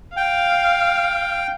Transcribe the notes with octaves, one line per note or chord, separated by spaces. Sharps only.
F5 G5